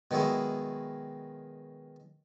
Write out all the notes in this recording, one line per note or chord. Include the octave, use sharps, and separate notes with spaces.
B2 D#3 F#3 G#3 E4